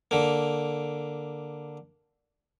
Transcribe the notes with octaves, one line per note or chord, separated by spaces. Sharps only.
D3 A#3